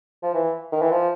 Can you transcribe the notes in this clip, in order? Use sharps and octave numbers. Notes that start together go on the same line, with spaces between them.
F3
E3
D#3
E3
F3